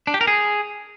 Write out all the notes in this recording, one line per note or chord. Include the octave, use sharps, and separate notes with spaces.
D4
G4
A#4
G#4